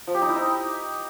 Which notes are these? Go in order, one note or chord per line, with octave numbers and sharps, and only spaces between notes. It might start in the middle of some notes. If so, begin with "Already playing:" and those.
F3
G4
D#4
E4
D#4